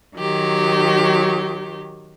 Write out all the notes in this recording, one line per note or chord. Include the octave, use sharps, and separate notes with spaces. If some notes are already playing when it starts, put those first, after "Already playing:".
D#3 F#3 G4